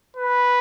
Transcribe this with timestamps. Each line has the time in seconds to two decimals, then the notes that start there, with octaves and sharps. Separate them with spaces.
0.17 B4